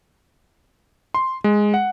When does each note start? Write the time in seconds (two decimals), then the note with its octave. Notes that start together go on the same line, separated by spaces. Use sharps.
1.14 C6
1.44 G#3
1.74 F#5